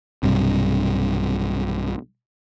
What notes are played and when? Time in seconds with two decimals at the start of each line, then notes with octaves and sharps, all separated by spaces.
0.23 B1 G2 C3